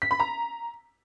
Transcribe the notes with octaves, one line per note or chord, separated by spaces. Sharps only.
B6
B5
A#5